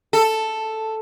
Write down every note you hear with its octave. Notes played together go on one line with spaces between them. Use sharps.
A4